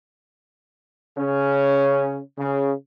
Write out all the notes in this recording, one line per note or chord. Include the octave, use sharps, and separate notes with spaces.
C#3 C#4
C#3